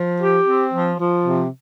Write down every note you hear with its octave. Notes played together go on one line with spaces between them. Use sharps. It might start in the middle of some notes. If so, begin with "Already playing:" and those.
Already playing: F3
G4
C4
F3
F3
C3